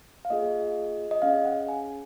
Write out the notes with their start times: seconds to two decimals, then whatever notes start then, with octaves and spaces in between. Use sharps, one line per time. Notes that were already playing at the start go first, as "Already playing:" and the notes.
0.25 F5
0.30 A#3 F4 G#4 D#5
1.11 D#5
1.22 C#4 G#4 F5
1.45 F#5
1.69 G#5